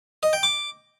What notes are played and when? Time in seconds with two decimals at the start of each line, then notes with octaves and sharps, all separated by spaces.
0.23 D#5
0.33 G5
0.43 D6